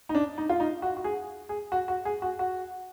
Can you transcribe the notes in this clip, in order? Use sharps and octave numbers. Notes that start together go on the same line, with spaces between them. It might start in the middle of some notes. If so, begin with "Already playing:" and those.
D#4
D4
D#4
F4
D#4
F#4
F#4
G#4
G#4
F#4
F#4
G#4
F#4
F#4